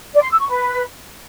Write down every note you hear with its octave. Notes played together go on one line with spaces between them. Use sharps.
D5
C6
E6
C#6
B4